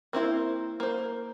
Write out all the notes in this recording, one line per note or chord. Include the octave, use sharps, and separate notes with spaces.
A#3 C4 E4 C5
A#3 C5